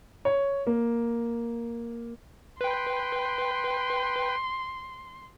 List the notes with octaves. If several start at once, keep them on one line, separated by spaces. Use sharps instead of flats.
C#5
A#3
B4 G5 C6